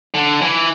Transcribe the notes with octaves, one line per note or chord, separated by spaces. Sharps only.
D3
E3